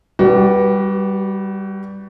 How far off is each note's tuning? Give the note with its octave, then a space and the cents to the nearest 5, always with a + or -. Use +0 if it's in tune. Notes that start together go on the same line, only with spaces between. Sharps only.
G3 +0 F#4 +30 B4 -15